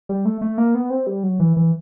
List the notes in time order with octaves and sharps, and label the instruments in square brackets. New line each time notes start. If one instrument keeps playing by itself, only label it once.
[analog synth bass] G3
A3
A3
A#3
B3
C4
G3
F#3
E3
E3